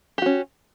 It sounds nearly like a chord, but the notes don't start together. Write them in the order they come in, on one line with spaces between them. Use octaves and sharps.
G4 F#4 C#4